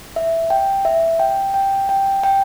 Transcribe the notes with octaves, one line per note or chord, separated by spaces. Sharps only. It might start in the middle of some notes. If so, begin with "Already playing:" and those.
E5
G5
E5
G5
G5
G5
G5